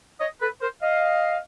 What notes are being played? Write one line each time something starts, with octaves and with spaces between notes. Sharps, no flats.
C#5 D#5
A4 B4
A#4 C5
D#5 F5